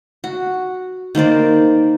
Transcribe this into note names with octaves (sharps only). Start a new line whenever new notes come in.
F#4
D#3 A#3 C5 D5